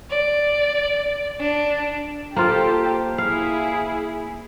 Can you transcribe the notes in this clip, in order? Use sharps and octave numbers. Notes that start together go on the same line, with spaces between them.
D5
D4
A#3 F4 G4 A4 C5
E4 G#4 F5